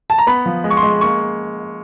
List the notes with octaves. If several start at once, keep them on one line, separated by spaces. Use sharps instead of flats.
A5
A#5
B3 B5
F3
G#3
C#6
C6
G#3
A#3 C#6